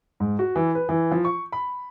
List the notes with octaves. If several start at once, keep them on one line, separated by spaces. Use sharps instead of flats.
G#2
F#4
E3
B4
E3
F3
C#6
B5